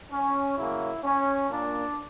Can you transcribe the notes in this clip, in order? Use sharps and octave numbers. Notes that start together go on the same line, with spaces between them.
C#4
C#3 F#3 A#3 E4
C#4
A#2 A#3 D4